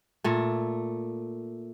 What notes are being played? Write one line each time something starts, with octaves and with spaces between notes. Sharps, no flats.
A#2 A3